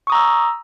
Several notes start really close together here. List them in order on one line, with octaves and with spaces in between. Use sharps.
C#6 D#6 A#5 E6